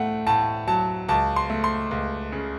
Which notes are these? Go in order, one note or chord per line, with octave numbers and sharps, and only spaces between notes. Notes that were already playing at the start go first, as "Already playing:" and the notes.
Already playing: A2 A3 F#5
A2 A5
F#3 A5
C#2 A5
C6
A3
C6
C#2
C#3